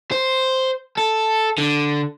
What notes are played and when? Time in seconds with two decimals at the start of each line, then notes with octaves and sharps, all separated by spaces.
0.11 C5
0.98 A4
1.58 D3